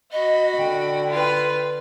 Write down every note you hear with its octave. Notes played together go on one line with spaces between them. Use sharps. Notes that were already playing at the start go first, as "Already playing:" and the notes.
F#4 D#5 B5
D3 G5
F4 B4